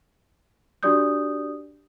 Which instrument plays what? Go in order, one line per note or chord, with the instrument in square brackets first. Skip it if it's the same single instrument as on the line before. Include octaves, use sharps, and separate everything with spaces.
[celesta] D4 F#4 G4 D5 D#6 G6